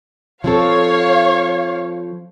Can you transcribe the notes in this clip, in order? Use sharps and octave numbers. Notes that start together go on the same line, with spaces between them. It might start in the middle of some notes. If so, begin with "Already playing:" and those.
F3 C4 A4 C#5 F5